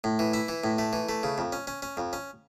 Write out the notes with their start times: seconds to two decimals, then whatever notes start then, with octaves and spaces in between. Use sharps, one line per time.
0.04 A2
0.19 E3
0.34 E4
0.48 E3
0.64 A2
0.78 A3
0.93 E3
1.09 A3
1.23 C#3
1.38 F2
1.52 C#4
1.67 C#4
1.82 C#4
1.97 F2
2.13 C#4